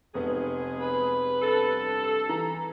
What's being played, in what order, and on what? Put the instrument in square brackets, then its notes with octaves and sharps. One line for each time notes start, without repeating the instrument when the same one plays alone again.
[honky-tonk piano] F1 B3 [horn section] G#3 G#4
[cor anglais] B4
[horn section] G2 A4
[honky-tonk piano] E3 A#5